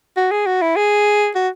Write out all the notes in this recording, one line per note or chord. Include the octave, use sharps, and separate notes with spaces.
F#4
G#4
F#4
E4
G#4
F#4